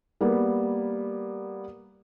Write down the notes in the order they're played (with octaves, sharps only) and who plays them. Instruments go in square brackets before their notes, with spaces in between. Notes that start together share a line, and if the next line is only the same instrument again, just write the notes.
[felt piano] G3 A#3 B3